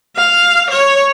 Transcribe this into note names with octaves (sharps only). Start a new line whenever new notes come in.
F5
C#5